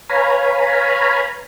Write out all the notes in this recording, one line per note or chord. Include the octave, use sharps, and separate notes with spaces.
B4 C#5 F5 G#5 A#5 B5